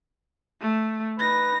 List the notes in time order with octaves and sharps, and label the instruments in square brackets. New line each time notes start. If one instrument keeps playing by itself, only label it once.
[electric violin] A3
[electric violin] D#4 A#6 [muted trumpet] B4